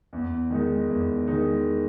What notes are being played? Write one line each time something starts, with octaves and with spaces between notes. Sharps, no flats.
E2
D#3 G#3 D#4
E2
D#3 G#3 D#4